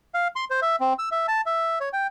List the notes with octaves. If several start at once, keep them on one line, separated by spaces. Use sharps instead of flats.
F5
C6
C5
E5
C4
E6
E5
A5
E5
C#5
G5